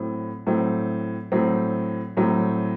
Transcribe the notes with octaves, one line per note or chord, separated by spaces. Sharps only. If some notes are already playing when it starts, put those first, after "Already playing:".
Already playing: A2 F#3 C4
A2 F#3 C4
A2 F#3 C4
A2 F#3 C4